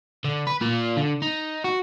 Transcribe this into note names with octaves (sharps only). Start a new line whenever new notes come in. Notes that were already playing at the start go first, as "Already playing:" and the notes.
D3
B4
A#3 F4
D3
D#4
F#4